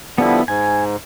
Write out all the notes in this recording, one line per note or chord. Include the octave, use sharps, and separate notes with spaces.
D3 F3 G3 B3 E4
G#2 G#5